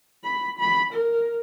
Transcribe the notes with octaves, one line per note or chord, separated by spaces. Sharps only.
B5
B5
A#4